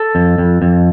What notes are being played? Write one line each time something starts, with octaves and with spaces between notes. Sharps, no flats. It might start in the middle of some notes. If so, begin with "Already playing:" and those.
Already playing: A4
F2
F2
F2